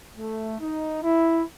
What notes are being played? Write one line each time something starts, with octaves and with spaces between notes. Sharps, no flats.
A3
D#4
E4